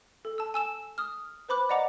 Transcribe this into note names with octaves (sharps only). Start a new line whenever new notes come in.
A4
A5 E6
G#5 E6 E7
D#6 F6
B4 C5 B5 D6 F#6
D5 D#5 F#5 A#5 D6